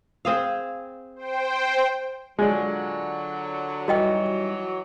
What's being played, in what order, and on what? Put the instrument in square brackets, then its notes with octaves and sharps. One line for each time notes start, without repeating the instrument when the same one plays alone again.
[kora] C4 G#4 F5
[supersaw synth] C5 G5
[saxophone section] D3 F#3 [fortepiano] G#3 [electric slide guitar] F4 D5
[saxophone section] E3 F#3 [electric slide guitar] G3 D#4 [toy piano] F#4 D#5 G5